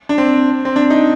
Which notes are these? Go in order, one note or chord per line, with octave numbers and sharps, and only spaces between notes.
D4
C4
C4
D4
D#4